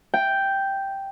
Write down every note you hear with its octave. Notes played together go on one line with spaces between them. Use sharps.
G5